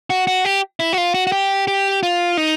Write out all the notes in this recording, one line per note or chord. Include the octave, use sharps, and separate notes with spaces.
F#4
F#4
G4
E4
F#4
F4
F#4
F#4
G4
G4
F4
D#4